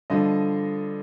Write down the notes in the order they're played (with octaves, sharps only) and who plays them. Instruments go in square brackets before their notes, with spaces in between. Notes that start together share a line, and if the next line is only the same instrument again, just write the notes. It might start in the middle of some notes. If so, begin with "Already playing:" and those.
[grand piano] G2 D3 F3 D#5